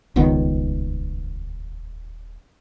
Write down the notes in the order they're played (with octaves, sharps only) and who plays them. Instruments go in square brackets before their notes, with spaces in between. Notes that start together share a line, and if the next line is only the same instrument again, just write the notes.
[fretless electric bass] D#1 C#2 D#3 B3